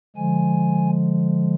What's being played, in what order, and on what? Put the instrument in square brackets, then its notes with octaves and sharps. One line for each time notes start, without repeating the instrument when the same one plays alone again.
[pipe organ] D3 F3 G#3 G#5